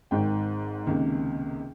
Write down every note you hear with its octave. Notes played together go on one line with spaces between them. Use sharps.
G#1 G#2 D#3 G5
C#2 C3 D#3 A#3